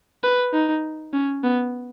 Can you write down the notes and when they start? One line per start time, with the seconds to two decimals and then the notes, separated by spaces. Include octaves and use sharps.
0.24 B4
0.53 D#4
1.13 C#4
1.44 B3